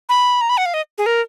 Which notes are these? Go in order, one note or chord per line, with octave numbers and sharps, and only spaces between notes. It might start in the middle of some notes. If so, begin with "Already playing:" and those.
B5
A#5
B5
F#5
F5
D#5
G#4
A#4